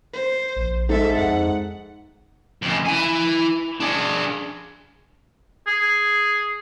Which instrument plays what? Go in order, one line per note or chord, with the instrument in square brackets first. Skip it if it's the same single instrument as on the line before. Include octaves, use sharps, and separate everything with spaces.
[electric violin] C5
[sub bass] A#1
[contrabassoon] G#2 [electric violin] A4 E5
[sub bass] F2 [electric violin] F#5
[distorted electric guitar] F2 C#3
E4 G#5
D4 G#4
[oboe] G#4